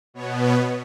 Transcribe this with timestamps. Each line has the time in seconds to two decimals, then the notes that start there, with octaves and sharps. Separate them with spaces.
0.14 B2 B3 C#5
0.43 C#5